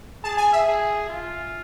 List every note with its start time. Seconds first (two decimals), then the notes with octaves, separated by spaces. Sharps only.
0.24 G#4 A5
0.37 G#5
0.53 E5
0.66 G#4
1.09 F4